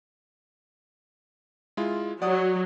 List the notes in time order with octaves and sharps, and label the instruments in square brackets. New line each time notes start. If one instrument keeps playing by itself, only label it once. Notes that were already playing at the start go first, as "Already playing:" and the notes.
[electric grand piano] G#3 E4 F4
[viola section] F#3 [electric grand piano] D5 F#5 D#6